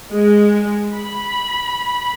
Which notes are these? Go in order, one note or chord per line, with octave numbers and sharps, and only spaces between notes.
G#3
B5